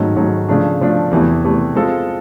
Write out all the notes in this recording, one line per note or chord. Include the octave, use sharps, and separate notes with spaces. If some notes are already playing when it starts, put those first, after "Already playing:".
Already playing: G#2 D#3 F#3 A3 C#4
G#2 D#3 F#3 A3 C#4
C#3 F3 A3 D4
C#3 F3 A3 D4
E2 C3 E3 A3
E2 C3 E3 A3
G#3 C4 F4 A4